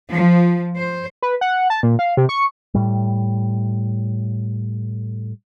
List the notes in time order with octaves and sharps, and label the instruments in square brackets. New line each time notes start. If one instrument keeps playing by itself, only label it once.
[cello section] F3
C5
[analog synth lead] B4
F#5
A5
A#2
F5
C3
C#6
[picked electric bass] A2 G3